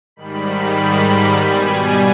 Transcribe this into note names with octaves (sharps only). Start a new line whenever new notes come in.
G#2 D#3 G3 B5
B2 G3 G#5